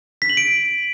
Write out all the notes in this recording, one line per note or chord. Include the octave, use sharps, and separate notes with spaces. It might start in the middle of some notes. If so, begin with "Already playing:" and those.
B6
F#7
D7